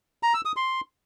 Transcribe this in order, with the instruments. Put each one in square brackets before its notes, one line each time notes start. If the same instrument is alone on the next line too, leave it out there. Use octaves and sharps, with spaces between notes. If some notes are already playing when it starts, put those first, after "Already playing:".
[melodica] A#5
E6
D#6
C6